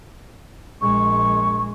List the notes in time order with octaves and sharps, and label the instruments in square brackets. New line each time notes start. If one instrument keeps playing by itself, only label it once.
[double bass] A#1 G#3 [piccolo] C#6